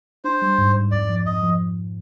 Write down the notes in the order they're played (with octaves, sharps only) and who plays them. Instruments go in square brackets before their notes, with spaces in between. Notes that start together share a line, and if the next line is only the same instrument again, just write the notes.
[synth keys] D4 [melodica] C5
[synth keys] G3
G#2
G#2
[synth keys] F2 [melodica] D5
[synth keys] F3
[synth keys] F2 [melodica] D#5
[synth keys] F3